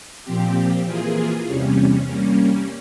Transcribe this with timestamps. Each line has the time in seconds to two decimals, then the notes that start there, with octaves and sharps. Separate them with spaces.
0.25 A#2 F3 C4 G4
0.84 E3 A#3 F4 G#4
1.46 E2 C3 G3 C#4
2.06 G3 A#3 C#4